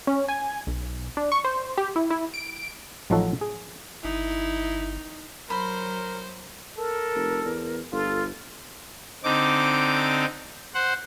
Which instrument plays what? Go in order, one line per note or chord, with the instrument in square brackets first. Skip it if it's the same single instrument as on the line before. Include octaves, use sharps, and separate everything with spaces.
[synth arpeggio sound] C#4
G#5
B1
D4
C#6
C5
G4
E4
E4
D7
[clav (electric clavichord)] A1 F3 F#3 D#4 F#4 A4
G#4
[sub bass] G1 [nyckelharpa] D#4 [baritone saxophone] E4
[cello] F#3 [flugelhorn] A#4 [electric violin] C5 [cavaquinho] B5 C6
[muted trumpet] A4 [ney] A#4
[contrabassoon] F1
E2
[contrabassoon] G1 [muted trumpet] F4 [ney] A4
[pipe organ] D3 C4 D#4 D6
C5 F#5